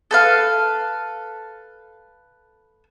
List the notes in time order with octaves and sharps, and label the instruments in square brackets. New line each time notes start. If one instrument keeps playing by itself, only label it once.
[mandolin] A4 B4 F5